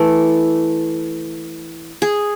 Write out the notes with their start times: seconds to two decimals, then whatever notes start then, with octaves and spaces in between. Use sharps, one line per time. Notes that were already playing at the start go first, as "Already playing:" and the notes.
Already playing: E3 A3 A4
2.02 G#4